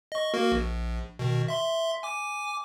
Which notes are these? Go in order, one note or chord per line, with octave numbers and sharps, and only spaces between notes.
D#5 C#6
A#3 F#4 A#4
A#1
B2 D#3
E5 C6
G#5 D6